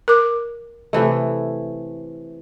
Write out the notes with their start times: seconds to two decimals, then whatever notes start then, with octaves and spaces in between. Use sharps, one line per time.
0.08 A#4 D6
0.93 C3 E3 A3